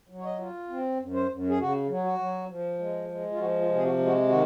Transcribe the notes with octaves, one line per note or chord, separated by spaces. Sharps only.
F#3
C#5
D#5
F4
C4
F#2
C5
F#2
G#4
C#3 F#4
F#3
F#4
F#3
F3
G#3
G#3
F4
F3 F#4
F4
C3
G#4
F#4
G#3
F#4
D#3 F#4